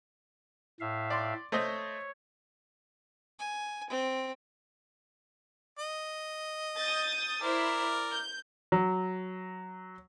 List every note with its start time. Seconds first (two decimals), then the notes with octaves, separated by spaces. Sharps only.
0.80 A2 E5 F5
1.10 D5 C6
1.52 A3 C5 C#5 D#5
3.40 G#5
3.90 C4
5.79 D#5
6.79 D#6 G6 A6
7.41 E4 A#4 C5 D5
8.10 G6
8.72 F#3